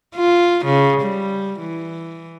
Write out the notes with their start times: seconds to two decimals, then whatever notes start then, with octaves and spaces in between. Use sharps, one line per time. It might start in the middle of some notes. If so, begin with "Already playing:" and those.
0.16 F4
0.66 C#3
1.02 G3
1.60 E3